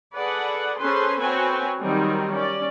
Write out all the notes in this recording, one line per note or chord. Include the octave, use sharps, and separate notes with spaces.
G#4 A4 B4 D5 F#5
C#4 G#4 A4 B4 C5 C6
C4 F#4 B4 C#5 G#5
D#3 F#3 G3 C4 D#4
C#4 D5